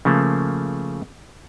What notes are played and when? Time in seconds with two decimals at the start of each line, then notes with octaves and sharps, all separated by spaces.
0.05 C#3 F3 A3 A#3